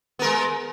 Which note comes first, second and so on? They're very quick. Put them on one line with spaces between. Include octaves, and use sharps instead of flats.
B3 A#4 G#3